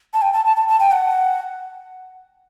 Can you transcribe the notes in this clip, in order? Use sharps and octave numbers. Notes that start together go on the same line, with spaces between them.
A5
G5
A5
A5
A5
A5
G5
F#5